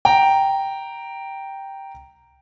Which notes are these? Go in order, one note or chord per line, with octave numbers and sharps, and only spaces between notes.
G5 A#5